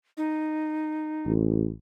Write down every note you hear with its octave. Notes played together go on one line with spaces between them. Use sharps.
D#4
A1